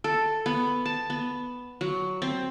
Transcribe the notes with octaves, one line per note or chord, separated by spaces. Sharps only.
A4
B3
A5
B3
F#3
C4